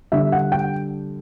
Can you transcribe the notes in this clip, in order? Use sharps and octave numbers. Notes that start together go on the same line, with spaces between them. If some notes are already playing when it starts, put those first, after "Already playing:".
D3 G3 D4 E5
F#5
G5